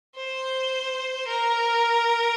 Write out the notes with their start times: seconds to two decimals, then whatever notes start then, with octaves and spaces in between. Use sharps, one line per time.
0.17 C5
1.28 A#4